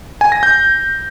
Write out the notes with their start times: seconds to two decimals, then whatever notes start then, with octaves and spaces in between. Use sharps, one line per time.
0.21 G#5
0.32 A#6
0.43 G6